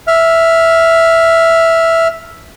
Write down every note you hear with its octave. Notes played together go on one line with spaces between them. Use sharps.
E5 F6